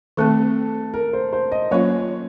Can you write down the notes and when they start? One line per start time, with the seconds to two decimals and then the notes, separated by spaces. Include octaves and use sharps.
0.17 D#3 A3 C4 A4
0.94 A#4
1.13 C5
1.33 C5
1.52 D#5
1.71 F#3 A#3 C#4 F4 C#5